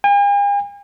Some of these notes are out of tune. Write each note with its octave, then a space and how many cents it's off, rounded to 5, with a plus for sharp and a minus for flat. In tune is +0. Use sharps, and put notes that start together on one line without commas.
G#5 -45